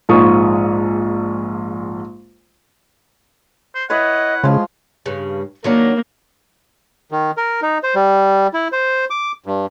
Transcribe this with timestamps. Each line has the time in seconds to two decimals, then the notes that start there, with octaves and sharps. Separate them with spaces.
0.09 A#1 G#2 F4 C#6 D#6
3.75 C5
3.90 E4 B4 C#5 D#5 F#5
4.43 C#3 F3 G#3 C6
5.06 G2 C#3
5.64 D#3 F#3 A#3 D4
7.11 D#3
7.37 A#4
7.62 D#4
7.83 C5
7.95 G3
8.54 E4
8.72 C5
9.10 D6
9.46 G2